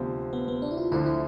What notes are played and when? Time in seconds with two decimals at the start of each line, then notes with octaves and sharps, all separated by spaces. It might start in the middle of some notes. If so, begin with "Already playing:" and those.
Already playing: D2 C3 F3 B3
0.33 B3
0.48 B3
0.62 D4
0.71 E4
0.77 F4
0.92 D2 D3 F3 E4
1.06 E4